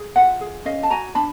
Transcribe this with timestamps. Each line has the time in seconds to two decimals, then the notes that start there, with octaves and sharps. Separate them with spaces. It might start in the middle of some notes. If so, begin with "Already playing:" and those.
Already playing: G#4
0.16 F4 E5 F#5
0.41 G#4
0.65 C#4 D#5 F5
0.83 A5
0.90 F#4 G#5 A#5
1.15 D4 A5 B5